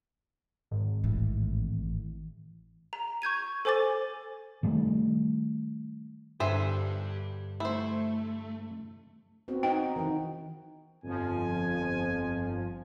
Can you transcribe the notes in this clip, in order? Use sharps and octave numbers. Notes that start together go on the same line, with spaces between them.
G#1
A1 E3
A#5
C#6 G6 G#6 D#7
A4 C5 G#5 D6 A6
D#3 G3 A3
G2 D3 G4 B4 C5 E5 G#5 A5
A3 E4 C5
B3 C4 F#4
D#4 G5
D#3 E3
G1 F2 F3 G#5